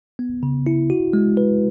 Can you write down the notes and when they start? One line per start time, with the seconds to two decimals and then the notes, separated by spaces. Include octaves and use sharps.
0.19 B3
0.43 C#3
0.67 E4
0.90 F#4
1.13 G#3
1.37 B4